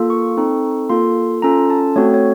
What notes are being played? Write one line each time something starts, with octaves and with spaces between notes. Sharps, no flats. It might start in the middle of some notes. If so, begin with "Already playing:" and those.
Already playing: A#3 F4 A4
C#6
C4 D#4 A4
A#3 F4 A4 C6
C#4 F4 A4 A#5
A5
A3 C4 F#4 A4 C#5
C#5